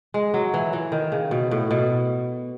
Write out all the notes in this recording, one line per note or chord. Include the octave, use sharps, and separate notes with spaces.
G#3
F#3
E3
E3
D#3
C#3
B2
A2
B2